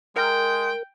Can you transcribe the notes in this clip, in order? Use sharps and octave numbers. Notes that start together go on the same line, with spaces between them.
G#3 A#4 G5